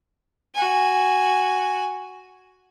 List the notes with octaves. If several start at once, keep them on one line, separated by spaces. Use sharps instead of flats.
F#4 G#5